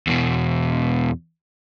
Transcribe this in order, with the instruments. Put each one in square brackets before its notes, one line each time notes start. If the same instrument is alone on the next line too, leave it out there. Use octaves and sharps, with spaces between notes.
[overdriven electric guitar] E2 B2